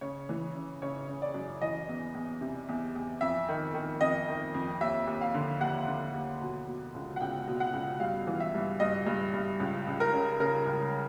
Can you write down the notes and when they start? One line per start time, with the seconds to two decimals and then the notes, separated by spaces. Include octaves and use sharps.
0.01 C#3 C#5
0.29 E3
0.55 C#3
0.82 C#3 C#5
1.08 C#3
1.22 D5
1.34 F#2
1.61 E3 D#5
1.88 E2
2.14 E2
2.41 C3
2.69 E2
2.95 E2
3.21 F2 E5
3.48 D#3
3.74 D#3
4.01 F2 D#5
4.28 D#3
4.55 F2
4.81 D#2 E5
5.07 D#2
5.21 F5
5.34 D3
5.60 D#2 F#5
5.87 D3
6.14 D#2
6.41 B2
6.67 B2
6.94 C#2
7.16 F#5
7.21 C#2 G5
7.47 B2
7.60 F#5
7.73 C#2
8.00 G2 F5
8.27 E3
8.40 E5
8.54 G2
8.80 G2 D#5
9.06 G2
9.33 G2
9.60 C#2
9.87 C#2
10.00 A#4
10.13 C#3
10.40 C#3 A#4
10.66 C#2